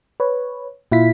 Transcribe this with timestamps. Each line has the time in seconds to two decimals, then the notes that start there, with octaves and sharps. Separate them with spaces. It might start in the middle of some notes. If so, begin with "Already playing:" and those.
0.20 B4 C#5
0.92 A#2 E4 F4 B6